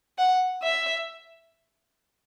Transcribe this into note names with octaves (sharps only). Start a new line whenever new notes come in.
F#5
E5